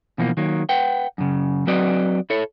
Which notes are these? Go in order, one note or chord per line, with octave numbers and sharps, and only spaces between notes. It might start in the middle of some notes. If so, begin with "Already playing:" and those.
B2 E3 F3 A#3
D#3 F#3 A#3
B4 F#5 G5
F#2 C#3
F#3 C4 F#4 B4 D5 D#5
E4 A4 C#5